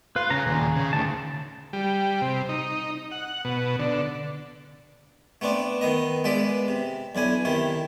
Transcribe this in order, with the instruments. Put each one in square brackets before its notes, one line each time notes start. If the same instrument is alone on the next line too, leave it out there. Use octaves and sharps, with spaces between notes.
[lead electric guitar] F4 [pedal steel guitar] B4
[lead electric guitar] C#3 [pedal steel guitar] G#4 A#5
[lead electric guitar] D#2 A#2
C#3
[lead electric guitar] D2 [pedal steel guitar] D#3 A5
[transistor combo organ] G3
C3
D#4
F#5
B2
D3
[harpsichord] A3 B3 C4 D4
D#3 B3 D#5
G#3 B3 D5 E5
C3
B1 D3 E4 G#5
C3 D#3 E4